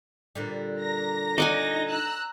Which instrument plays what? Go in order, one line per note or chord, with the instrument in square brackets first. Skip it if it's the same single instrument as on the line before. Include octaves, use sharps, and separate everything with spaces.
[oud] A#2 D3 G3
[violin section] A#5 A#6
[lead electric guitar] D#4 [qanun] D5 F#5 G#5
[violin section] A#5 E6 F#6